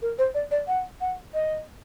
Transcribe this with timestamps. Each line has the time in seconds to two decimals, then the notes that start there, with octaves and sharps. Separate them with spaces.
0.02 A#4
0.18 C5
0.34 D5
0.51 D5
0.67 F#5
1.01 F#5
1.34 D#5